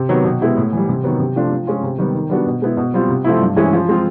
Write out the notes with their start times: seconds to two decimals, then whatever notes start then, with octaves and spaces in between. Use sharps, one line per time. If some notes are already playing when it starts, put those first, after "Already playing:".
Already playing: C3
0.09 D#3 F#3 B3
0.25 B2
0.41 G#3 B3 E4 G4
0.57 A2
0.73 E3 G3
0.89 C3
1.04 D#3 F#3 B3
1.20 C3
1.36 F3 A3 D4 F4
1.51 F3
1.67 G#3 C#4 F4
1.83 C3
1.98 D#3 G3 B3
2.15 D#3
2.30 G3 B3 D4 F#4
2.47 B2
2.62 G#3 B3 E4
2.77 B2
2.94 G3 C4 F4
3.09 C3
3.24 F3 A3 C4 E4
3.41 G2
3.56 E3 G#3 C#4 E4
3.73 F3
3.89 G#3 C4 F4